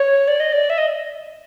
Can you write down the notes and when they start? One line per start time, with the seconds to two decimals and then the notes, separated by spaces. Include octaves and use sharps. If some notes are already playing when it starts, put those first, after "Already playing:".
Already playing: C#5
0.28 D5
0.40 D#5
0.52 D5
0.70 E5
0.78 D#5